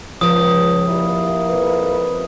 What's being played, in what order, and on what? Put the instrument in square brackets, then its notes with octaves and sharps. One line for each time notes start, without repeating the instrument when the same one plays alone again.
[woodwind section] C#2 [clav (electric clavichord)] F3 [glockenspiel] D#6
[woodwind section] G3 A#3 E4
[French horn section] F2 B4